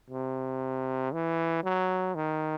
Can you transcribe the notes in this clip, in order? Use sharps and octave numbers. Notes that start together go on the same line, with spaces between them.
C3
E3
F#3
D#3